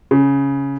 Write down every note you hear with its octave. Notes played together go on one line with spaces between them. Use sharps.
C#3